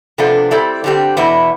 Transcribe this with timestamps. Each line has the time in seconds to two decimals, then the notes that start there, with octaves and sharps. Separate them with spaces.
0.18 C3 F3 B3 D4 A4
0.51 G3 C4 E4 A4 D5
0.84 D3 G3 C4 G4
1.17 E2 B2 B3 E4